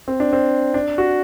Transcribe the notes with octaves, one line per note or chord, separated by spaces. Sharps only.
C4
D4
C4
D4
F#4